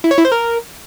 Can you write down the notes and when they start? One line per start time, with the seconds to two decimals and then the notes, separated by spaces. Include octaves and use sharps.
0.04 E4
0.11 C#5
0.18 E4
0.25 C5
0.32 A#4